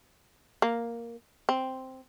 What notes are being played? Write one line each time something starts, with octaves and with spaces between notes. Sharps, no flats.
A#3
C4